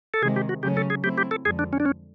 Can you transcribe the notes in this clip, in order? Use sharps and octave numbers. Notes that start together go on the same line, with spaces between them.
A4
C3 D#3 G#3 G#4
G4
F#4
C#3 F#3 A3 C#4 G4
A4
G#4
F#3 A3 C4 E4 G4
G4
A4
F2 D3 F3 G#3 G#4
D4
C#4
D4
C#4